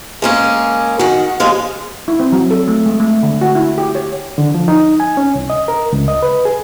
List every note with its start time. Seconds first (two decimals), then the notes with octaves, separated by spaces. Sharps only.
0.22 G#3 A#3 C#4
0.99 D#3 F#4
1.40 D#2 F3 G#3 F5
2.08 E4
2.20 C4
2.32 F#3
2.51 A4
2.68 A3
2.86 G#3
3.00 A3
3.23 D3
3.41 F#4
3.55 E4
3.78 G4
3.95 C#5
4.38 D3
4.54 F3
4.68 D#4
5.00 G#5
5.17 C#4
5.35 C2
5.50 D#5
5.68 A#4
5.93 C#2
6.08 D#5
6.23 B4
6.45 G#4